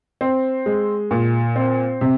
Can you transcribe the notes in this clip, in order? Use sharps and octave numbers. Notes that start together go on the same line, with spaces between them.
C4
G#3
A#2
C4
C3